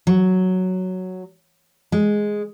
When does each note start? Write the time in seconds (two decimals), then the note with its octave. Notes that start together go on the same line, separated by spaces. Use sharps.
0.07 F#3
1.92 G#3